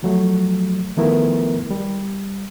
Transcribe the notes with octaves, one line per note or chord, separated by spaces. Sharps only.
F3 F#3 A3
D#3 F3 A3 B3 E4 A#4
G3